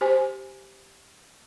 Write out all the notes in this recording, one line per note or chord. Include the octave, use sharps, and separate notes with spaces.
G4 C5 G#5